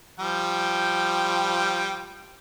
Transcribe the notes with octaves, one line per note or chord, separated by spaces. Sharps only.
F3 G3 G5